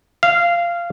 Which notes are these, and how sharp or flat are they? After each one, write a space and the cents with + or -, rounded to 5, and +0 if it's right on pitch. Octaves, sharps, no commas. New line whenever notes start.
F5 -15